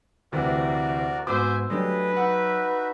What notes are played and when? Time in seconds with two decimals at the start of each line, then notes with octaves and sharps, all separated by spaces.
0.32 D2 C3 E3 F#4 A#4 D5
1.27 G#2 B3 F#4 C5 E5 G#5 D6 E6
1.70 F#3 A3 D4 G4 G#4 B4 D#5
2.17 D#4 F#4 E5 F#5